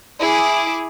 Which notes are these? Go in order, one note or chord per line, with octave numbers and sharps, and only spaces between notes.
E4 G#4 D6